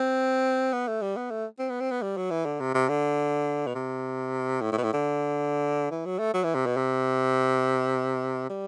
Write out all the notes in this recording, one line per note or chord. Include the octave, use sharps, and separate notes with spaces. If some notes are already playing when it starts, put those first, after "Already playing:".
Already playing: C4
B3
A3
G3
B3
A3
C4
B3
C4
B3
G3
F#3
E3
D3
C3
C3
D3
B2
C3
A2
A2
B2
A2
D3
E3
F#3
A3
F#3
E3
C3
B2
C3
G3